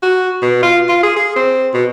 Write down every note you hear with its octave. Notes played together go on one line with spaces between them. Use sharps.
F#4
B2
F4
F4
G#4
G#4
C4
B2